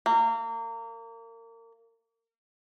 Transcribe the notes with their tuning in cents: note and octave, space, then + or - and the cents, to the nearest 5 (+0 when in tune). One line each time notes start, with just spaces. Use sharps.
A#3 -30